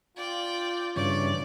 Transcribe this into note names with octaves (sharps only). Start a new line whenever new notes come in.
F4 D5 G5
G2 C#3 E3 C#5 D5